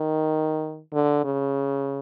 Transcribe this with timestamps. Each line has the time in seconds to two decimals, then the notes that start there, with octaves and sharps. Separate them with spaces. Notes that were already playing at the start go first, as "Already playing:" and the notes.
Already playing: D#3
0.93 D3
1.24 C#3